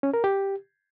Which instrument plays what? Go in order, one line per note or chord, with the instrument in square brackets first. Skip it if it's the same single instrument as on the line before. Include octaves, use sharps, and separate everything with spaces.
[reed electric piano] C#4
A#4
G4